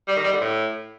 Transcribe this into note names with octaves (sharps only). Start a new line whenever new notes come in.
G3
D#3
G3
D3
A2